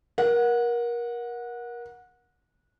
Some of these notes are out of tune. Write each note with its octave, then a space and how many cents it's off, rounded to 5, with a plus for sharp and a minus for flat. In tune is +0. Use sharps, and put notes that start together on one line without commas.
A#4 +25 F#5 -20